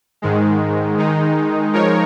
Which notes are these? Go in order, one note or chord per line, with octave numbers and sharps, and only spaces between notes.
G#2 D#3 G#3
D#3 G#3 D#4
F3 G#3 D#4 A#4 C#5